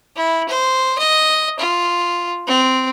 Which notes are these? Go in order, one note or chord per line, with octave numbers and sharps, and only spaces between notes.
E4
C5
D#5
F4
C4